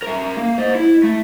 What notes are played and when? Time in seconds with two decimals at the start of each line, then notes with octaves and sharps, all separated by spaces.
0.02 A#4 E5
0.37 A#3
0.58 C5 D#5
0.75 E4
1.03 A3